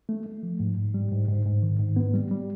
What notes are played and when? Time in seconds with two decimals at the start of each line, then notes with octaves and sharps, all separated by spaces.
0.09 A3
0.26 A3
0.43 F3
0.60 G#2
0.77 G#2
0.94 G3
1.11 G#2
1.28 G#2
1.45 G#2
1.63 D#3
1.80 G#2
1.96 B3
2.14 G3
2.31 G3